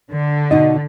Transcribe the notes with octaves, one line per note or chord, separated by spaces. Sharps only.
D3
B2 D#4 D#5